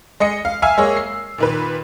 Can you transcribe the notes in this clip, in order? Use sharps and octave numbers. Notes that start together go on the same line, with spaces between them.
G#3 D#5 C#7
F5
E5 F5 G#5 E6 F6
G#3 A#3 G#4 C#5
C7
A#2 D#3 B4